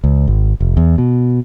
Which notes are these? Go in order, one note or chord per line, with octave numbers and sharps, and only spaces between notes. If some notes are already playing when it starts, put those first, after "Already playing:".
C#2
G#1
F1
E2
B2